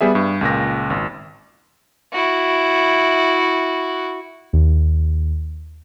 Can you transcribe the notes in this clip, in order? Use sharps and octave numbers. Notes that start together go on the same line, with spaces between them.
G3 B3 G#4 E5
G2
C#2 A#2 A#6
G#1
E4 F#4
D#2